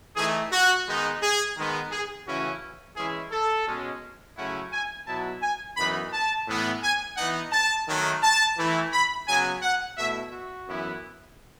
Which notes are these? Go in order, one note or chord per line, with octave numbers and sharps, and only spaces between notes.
E3 A3 D#4 G#4
F#4
D#3 G#3 B3 D#4
G#4
D#3 G#3 B3
G#4
C#3 E3 A3 C#4 E4 F#4
E3 G#3 C#4 E4 G#4
A4
B2 G#3 C#4
C#3 F#3 A3 C#4 E4 F#5
G#5
B2 F#3 B3 E4 A5
G#5
F#2 E3 B3 D#4 B5
A5
A2 E3 B3
G#5
E3 B3 D#4 F#5
A5
D#3 F#3 A3
A5
E3 A3 E4
B5
C#3 F#3 B3 G#5
F#5
B2 A3 E4 E5
F#4
F#2 E3 B3 E4